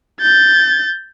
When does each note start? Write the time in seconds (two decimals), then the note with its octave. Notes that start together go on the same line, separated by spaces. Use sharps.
0.22 G6 A6